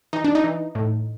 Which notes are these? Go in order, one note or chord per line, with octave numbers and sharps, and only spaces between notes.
E3 D#4
D4
D#4
E3
A2